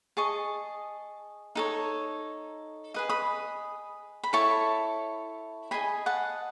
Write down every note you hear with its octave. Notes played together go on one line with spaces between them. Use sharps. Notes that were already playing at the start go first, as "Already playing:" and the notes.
G#4 D#5 A5 C#6
D#4 A4 C#5
G#4 B4 D#5 D#6
B5 D#6
B5
E4 A4 C#5 A5 C#6
G#4 D#5 G#5 B5
F#5 A5